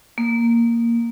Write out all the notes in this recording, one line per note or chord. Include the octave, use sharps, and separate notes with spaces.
A#3